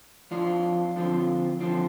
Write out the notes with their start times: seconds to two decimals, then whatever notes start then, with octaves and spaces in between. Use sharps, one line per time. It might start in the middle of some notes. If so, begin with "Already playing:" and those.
0.31 F2 F3 D4 F4
0.96 D3 F3 C4 F4
1.60 D3 F3 C4 F4